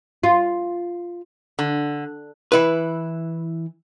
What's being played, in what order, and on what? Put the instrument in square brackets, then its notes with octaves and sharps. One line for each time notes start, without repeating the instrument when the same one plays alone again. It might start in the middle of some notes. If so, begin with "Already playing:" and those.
[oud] F4
[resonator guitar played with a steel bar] D3
[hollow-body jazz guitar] E3 E4 B4